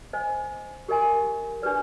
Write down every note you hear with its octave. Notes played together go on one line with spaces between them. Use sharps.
C5 D#5 G#5
G4 A#4 D#5 G#5 C6
D4 G4 B4 D5